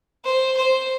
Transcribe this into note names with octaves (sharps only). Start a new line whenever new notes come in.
C5
C5